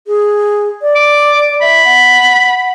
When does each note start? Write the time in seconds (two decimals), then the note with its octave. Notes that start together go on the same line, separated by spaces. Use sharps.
0.07 G#4
0.82 D5
0.95 D6
1.62 E5 B5
1.84 F#5